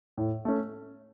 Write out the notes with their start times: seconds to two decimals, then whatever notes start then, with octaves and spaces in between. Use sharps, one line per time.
0.17 A2
0.45 A3 C#4